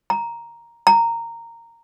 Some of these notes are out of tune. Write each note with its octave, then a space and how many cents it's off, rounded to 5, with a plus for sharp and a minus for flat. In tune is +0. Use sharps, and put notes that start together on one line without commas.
A#5 +5
A#5 -10